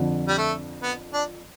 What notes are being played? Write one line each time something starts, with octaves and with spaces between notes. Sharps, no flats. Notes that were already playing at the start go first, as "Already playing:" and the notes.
Already playing: F2 D3 F3
G3
A3
B3
D4